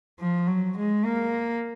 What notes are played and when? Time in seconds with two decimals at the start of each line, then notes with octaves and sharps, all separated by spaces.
0.20 F3
0.47 F#3
0.77 G#3
1.05 A#3